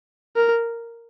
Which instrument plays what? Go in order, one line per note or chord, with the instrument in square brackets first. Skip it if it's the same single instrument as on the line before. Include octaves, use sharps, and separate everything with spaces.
[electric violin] A#4